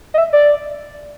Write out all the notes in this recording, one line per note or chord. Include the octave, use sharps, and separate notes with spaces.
D#5
E5
D5